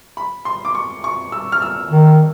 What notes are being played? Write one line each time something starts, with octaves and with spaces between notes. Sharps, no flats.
B5
C6
D6
C#6
C#6
E6
F6
E6
D#3